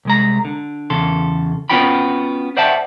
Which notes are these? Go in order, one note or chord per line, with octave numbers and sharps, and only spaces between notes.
C2 G#3 A#5
D3
E2 C#3 A4 C6
B3 C#4 F4 F#4 G5 B5
C5 D5 E5 F#5 G5 A5